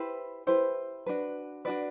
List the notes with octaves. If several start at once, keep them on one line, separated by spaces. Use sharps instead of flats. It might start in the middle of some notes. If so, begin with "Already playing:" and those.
Already playing: E4 G4 B4 C5
E4 G4 B4 C5
D4 F#4 B4
D4 F#4 B4 D5